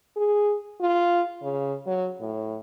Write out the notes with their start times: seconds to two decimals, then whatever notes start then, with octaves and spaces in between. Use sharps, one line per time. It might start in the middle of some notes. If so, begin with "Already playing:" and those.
0.16 G#4
0.81 F4
1.42 C#3
1.87 F#3
2.20 A2